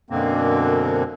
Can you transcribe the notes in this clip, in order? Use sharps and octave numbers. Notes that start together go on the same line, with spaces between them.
F#2 B2 D3 A#3 C4